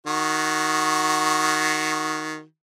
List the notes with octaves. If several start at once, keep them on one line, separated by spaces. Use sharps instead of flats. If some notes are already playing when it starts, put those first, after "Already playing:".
D#3 F#4